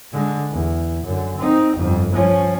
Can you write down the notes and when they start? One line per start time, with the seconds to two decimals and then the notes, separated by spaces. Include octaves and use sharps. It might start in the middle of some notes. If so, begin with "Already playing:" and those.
0.13 D3 G#3
0.51 E2
1.04 F#2 D3
1.37 C4 D#4
1.77 G1 F2
2.13 F3 C#4